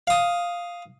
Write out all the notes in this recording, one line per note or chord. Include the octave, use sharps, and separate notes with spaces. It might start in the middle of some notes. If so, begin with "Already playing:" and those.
F5 D#6